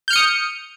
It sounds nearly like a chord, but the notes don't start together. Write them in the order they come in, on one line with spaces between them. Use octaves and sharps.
G6 F6 C#7 D#6